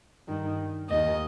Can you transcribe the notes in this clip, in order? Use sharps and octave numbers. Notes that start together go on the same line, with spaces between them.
G2 D#3
D#2 D#3 D#5